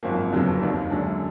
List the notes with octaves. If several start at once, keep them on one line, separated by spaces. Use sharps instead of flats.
G#1 F#2 F3 A#3
F#1 F2 D3 F#3 B3
D#2 D#3 A#3 D4
F#2 D3 G#3 D4